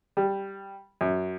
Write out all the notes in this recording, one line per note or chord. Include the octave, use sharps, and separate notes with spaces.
G3
F#2